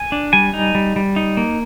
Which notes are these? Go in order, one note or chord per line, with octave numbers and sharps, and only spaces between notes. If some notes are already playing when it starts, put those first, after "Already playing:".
Already playing: G#5
D4
G3 G#5
D#4
G3
G3
D#4
A#3